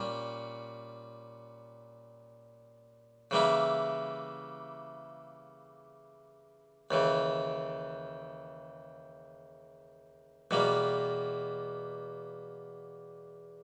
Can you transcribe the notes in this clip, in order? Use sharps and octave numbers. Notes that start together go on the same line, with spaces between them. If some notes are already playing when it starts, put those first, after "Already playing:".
Already playing: A#2 G3 C#4
C#3 E3 G3 A#3 E4
D#2 C#3 E3
E2 B2 G3 A#3